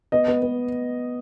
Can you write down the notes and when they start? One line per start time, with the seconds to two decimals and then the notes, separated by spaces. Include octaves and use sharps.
0.12 B3 D#5
0.28 B3
0.42 B3